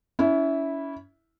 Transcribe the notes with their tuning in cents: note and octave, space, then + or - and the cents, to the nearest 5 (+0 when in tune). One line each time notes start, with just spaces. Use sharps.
C#4 +30 E4 -10